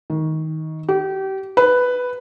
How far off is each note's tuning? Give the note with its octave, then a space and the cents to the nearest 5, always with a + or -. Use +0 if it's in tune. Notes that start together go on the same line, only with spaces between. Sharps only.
D#3 +20
G4 -30
B4 +5